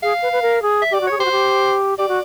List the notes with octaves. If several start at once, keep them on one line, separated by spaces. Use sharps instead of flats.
G#4 F5
B4
B4
A#4
G#4
E5
G4 D5
F#4
G#4 C#5
G4 C5
F#4
G4
G4 D5
F#4